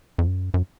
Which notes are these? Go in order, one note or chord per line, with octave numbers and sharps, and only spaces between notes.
F2
F#2
F#2